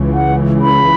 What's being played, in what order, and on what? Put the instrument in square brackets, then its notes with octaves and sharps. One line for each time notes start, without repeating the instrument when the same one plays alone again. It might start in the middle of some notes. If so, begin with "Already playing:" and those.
Already playing: [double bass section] C#2 C#3 E3
[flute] F#5
B5